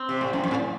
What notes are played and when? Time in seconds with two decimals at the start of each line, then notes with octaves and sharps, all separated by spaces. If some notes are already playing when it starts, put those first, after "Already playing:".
Already playing: C4
0.09 C3
0.21 A2
0.33 F#2
0.44 F2
0.51 A2